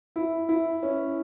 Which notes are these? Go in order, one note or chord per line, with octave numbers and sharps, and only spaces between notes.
E4
E4
C#4